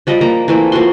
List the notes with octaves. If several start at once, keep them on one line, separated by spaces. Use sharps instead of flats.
F3 G3 D5 D#5
F3 A#3 A#5
E3 A3 A#3 C4
F3 A#3 F#4 C6